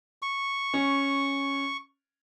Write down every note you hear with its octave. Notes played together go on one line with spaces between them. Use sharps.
C#6
C#4